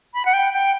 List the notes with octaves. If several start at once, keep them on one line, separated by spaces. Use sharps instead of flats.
B5
F#5
G5
G5